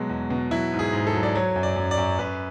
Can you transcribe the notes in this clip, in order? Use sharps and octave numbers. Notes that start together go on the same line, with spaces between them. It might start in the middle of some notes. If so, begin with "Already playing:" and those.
Already playing: B2 F#3 G#3
E2
B2
F#3 E4
G#2
G#4
G#2
A4
F#3
D5
F#3 C#5
F#2
D5
F#2
D5
F#2
F#2 B4